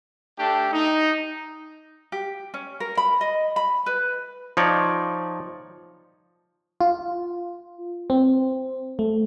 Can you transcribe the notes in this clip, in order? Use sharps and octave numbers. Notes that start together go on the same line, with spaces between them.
A3 D4 G4
D#4
G4
C#4
A#4
B5
D#5
B5
B4
F3 D#4 C#5 D5
F4
C4
A3